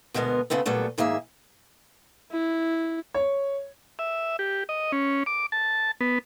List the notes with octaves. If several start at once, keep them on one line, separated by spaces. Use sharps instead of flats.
D2 B2 G#3 B3 A#4
C#3 A3 B3 C4
A#2 F#3 G3 A3 B3
G#2 D#3 A#3 G#4 E5
E4
C#5
E5
G4
D#5
C#4
D6
A5
B3